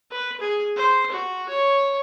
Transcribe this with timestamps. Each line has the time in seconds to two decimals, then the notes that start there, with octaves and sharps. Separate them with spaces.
0.11 B4
0.41 G#4
0.76 C5
1.12 F#4
1.49 C#5